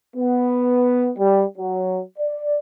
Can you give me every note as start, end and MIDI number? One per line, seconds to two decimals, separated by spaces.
0.16 1.10 59
1.18 1.42 55
1.57 2.00 54
2.18 2.58 74